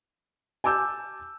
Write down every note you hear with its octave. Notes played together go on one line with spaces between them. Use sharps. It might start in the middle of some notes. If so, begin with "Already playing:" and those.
G#5 A5 D6 E6 G6